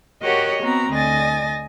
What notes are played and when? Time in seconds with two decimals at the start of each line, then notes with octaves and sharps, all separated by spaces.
0.23 F#4 G4 A#4 C#5 D#5 F#5
0.62 B3 C4 F#4 A#5
0.91 D2 D#5 G#5 A6 A#6